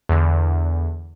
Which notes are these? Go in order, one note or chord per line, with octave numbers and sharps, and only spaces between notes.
E2 D3